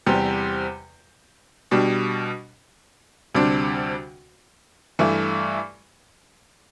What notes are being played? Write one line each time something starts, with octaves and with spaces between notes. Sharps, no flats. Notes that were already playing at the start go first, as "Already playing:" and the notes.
E2 C3 G3 C4 G4
B2 G3 D4
D2 C3 G3 D4
G2 E3 A3 E4